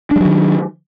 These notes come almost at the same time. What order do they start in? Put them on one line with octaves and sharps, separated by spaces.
D4 G3 F#3 D#3